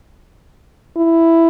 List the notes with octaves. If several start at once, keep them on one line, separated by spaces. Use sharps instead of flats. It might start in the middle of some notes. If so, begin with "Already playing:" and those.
E4